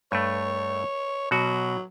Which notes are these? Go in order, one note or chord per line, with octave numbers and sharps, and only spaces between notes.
G2 A3 C#5
B2 F#3 F#4